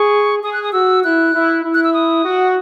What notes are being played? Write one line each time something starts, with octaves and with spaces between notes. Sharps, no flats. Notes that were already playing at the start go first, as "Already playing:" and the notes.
Already playing: G#4 C#6
G#4 D#6
F#6
D#6
F#4 E6
E4 F#6
E4
E4
F#6
E6
D#6
F#4